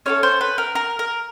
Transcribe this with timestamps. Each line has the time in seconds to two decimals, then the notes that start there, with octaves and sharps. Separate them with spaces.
0.06 C#4 E4 A4 C#5
0.23 C5
0.41 B4
0.58 A#4
0.75 A#4
0.99 A#4